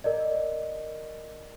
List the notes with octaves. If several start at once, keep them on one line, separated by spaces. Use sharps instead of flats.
A#4 D5 D#5